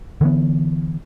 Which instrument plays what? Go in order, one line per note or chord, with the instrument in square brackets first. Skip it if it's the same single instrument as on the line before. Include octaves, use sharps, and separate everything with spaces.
[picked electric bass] D3 E3 G#3 B3